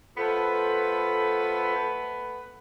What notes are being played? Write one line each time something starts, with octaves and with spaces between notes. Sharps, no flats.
A3 B3 F4 A4 B4 C5